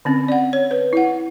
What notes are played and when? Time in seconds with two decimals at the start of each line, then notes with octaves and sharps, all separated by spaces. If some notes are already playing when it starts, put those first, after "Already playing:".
0.05 D3 C4 C#4
0.28 D5 F#5
0.53 C#5
0.71 B4
0.93 E4 F#5